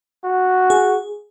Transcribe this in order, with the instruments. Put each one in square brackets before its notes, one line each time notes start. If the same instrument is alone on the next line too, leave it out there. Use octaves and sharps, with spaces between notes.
[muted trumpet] F#4
[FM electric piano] G#4